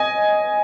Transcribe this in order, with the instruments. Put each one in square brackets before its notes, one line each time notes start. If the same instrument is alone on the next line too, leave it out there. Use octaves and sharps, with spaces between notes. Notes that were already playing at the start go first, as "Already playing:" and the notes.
Already playing: [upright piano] D#5 G#5